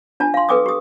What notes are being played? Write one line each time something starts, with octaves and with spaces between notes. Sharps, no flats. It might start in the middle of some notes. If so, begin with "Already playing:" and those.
D4 F4 A5
F5 C6
A4 B4 G5 D6 D#6
G4 D#6